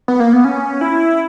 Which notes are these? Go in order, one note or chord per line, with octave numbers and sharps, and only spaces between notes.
B3
A#3
B3
C#4
E4